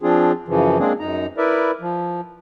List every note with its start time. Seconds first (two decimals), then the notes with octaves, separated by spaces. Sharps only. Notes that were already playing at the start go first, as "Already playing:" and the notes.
0.02 F3 C4 D4 F4 G#4
0.48 F#2 C#3 E3 F3
0.79 G#3 A#3 C4 D4 G#4
1.00 F#2 D#4 A#5
1.38 E4 A#4 B4 D5 E5
1.81 F3